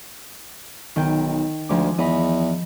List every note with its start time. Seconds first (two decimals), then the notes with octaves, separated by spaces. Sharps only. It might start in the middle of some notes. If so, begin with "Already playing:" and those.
0.96 B1 D#3 G5
1.69 D2 F3 G#3 D6
1.98 E2 D#5 B5